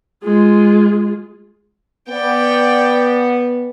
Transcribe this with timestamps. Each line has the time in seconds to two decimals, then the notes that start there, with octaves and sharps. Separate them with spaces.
0.23 G#3 F4
2.09 B3 D5 G5